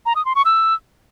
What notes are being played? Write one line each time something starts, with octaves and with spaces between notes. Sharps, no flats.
A#5
D#6
C6
C#6
E6